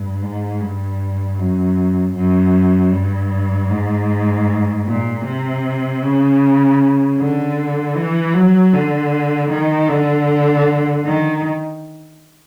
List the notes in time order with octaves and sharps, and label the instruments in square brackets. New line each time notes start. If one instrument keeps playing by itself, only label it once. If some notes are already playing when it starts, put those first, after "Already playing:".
Already playing: [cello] G2
G#2
G2
F#2
F#2
G2
G#2
A#2
C3
C#3
D3
E3
F#3
D3
D#3
D3
D#3